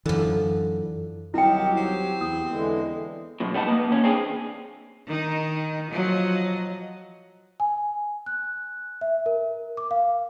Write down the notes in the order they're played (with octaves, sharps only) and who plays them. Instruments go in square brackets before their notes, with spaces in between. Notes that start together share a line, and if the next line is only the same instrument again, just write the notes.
[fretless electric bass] F#2 E3 [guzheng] D3 F3
[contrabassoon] C2 [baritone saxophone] D#3 [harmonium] F#3 G4 [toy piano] E4 G5
[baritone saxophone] C4
[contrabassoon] E2 [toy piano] D#6
[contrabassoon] E2 [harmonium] D3 E3 G#3
[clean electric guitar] F#2 B2
C2 G3 B3 D#4 A5
A#3 B3
D#2 C#4
C4 D4 G#4
[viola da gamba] D#3 D#4
F3 F#3 D#5
[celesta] G#5
F#6
E5
A#4
D6
F5